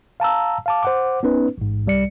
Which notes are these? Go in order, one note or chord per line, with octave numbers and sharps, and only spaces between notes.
F5 A5 A#5 E6
F5 A5 D6
C5 F#5 D6
B3 C#4 D#4 B4
A1 G#2
C2 G3 D5 C#7